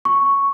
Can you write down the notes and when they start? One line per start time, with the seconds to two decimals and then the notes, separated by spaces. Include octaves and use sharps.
0.05 C#6